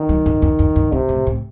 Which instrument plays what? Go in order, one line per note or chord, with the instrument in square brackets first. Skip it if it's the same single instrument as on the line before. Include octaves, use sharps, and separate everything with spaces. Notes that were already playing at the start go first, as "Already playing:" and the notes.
Already playing: [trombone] D#3
[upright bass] F#3
G2
F#2
F#2
G2
[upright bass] G2 [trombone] C3
[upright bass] A2
A2